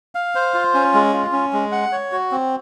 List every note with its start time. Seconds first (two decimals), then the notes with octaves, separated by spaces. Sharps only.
0.15 F5
0.35 C5
0.54 F4
0.74 C#4
0.94 G#3
1.13 F4
1.33 C#4
1.53 G#3
1.72 F#5
1.92 C#5
2.12 F#4
2.31 C4